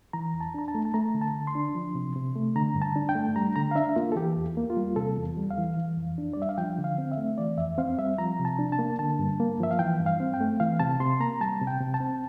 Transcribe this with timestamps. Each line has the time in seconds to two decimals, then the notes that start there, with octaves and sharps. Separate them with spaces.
0.13 E3 A#5
0.34 E2
0.41 A5
0.54 D4 A#5
0.68 A5
0.75 A3
0.85 A5
0.94 A3 A#5
1.14 D3
1.21 A5
1.35 D3
1.47 C6
1.55 D4
1.75 F3
1.95 C3
2.16 C3
2.35 A3
2.55 D3 A#5
2.75 G2
2.82 A5
2.96 D4
3.09 G5
3.15 A3
3.36 G3 A#5
3.56 D3 A#5
3.71 F5
3.75 D4 E5
3.96 A#3 F4
4.12 A4
4.16 E3 G4
4.36 E2
4.57 A#3
4.70 F4
4.77 G3
4.96 C3 A4
5.16 E2
5.37 G3
5.51 F5
5.58 E3
5.77 E3
5.97 F2
6.18 D4
6.33 D5
6.37 G3 E5
6.49 F5
6.58 F3 G5
6.78 D3
6.84 F5
6.98 C4
7.12 E5
7.17 A3
7.38 E3 D5
7.58 F2 E5
7.78 C4 F5
7.98 G3 E5
8.18 F3 A#5
8.39 C3
8.45 A5
8.59 D4
8.72 A5
8.79 A#3
8.99 D3 A5
9.19 G2
9.40 A#3
9.60 F3 E5
9.71 F5
9.79 E3 G5
10.00 G2
10.06 F5
10.20 C4
10.34 G5
10.41 A3
10.60 E3 F5
10.80 C3 A5
11.00 C3 C6
11.20 A#3 A#5
11.40 G3 A5
11.61 C3
11.67 G5
11.80 C3
11.94 A5
12.00 C4